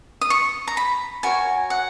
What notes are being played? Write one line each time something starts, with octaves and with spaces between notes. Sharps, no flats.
D#6
C#6
A#5
B5
F#4 A#4 C#5 G#5
F#5